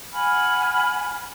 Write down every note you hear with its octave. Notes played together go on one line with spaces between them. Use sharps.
F#5 G#5 B5 F6